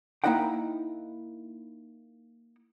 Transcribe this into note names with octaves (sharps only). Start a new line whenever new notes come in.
A#3 D#4 E4 D#5 F#5 G5